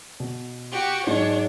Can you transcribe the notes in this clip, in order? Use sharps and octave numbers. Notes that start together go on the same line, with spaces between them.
B2
F#4 G4
G#2 F#3 D4 C#5